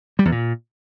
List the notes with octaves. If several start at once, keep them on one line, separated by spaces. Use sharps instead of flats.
G3
E2
A#2